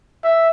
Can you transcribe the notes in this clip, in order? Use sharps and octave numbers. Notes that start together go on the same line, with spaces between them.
E5